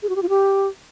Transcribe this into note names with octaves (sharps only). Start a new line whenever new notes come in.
G#4
F#4
G4
F4
G4